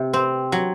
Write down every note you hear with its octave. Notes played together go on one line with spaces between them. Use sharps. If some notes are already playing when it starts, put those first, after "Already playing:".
Already playing: C3
C4
F#3